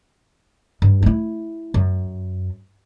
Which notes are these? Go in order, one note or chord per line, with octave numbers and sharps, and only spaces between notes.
G2
A3 E4
F#2